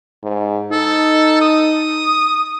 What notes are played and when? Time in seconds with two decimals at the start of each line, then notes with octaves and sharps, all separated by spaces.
0.23 G#2
0.72 D#4 A4
1.41 D#6